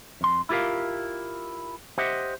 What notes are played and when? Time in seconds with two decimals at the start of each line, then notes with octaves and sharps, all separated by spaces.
0.21 F2 C6
0.49 E4 F4 G4 A#4 F5
1.98 G4 C5 D#5 E5 F#5